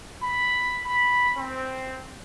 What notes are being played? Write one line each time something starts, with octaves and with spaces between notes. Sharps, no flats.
B5
B5
C4